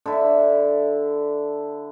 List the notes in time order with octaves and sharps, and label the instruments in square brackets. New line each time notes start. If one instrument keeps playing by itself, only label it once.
[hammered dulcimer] D3 E4